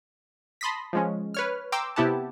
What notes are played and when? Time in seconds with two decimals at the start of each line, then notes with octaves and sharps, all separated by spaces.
0.61 A5 B5 C6 D#6 A#6 B6
0.93 F3 G#3 C#4
1.34 B4 C#5 F6
1.72 G5 A#5 C6 D6 E6
1.96 C3 B3 E4 G4 F#5 A5